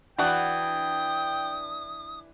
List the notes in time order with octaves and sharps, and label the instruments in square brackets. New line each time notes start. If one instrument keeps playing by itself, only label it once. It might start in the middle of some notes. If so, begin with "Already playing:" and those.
[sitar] E3 D4 [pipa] F#4 F#5 [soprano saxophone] G5 [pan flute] D#6